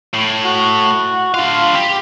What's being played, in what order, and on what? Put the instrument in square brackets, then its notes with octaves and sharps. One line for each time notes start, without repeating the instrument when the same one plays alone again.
[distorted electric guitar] A2
[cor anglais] F#4
[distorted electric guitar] D4 F5 [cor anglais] F4
[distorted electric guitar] G4